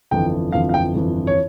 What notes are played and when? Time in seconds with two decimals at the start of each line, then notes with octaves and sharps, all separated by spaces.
0.11 G1 F2 E3 G5
0.52 G1 F2 E3 F5
0.69 F5
0.74 G5
0.95 G1 F2 E3
1.27 C#5